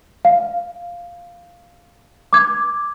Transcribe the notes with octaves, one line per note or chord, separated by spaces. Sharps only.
F5
D6 G#6